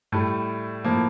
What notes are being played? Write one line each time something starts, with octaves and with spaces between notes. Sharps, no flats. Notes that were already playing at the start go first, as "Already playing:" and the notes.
A2 G3 A3
A2 F3 A#3